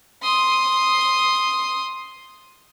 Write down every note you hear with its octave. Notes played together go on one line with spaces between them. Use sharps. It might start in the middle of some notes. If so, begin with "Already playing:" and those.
C6 D#6